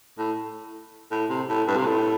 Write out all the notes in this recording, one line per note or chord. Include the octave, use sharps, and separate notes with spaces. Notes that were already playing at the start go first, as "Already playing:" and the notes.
A2
A2
C3
A2
G2
C3
A2